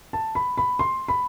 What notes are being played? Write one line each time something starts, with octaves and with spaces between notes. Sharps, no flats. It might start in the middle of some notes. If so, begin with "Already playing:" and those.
A5
B5
B5
C6
B5